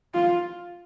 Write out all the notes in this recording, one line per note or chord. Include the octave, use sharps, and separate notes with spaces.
F4